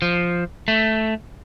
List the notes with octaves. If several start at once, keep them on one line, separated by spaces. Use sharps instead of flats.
F3
A3